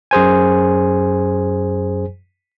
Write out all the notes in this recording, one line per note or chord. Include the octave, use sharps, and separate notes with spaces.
F#2 G#4 C5 G#5